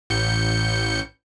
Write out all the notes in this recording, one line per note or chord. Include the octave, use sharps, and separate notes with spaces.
A1 G6 C#7